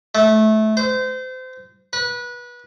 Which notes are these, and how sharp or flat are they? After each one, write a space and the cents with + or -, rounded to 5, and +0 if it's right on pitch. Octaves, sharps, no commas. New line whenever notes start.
A3 -20
C5 -30
B4 -25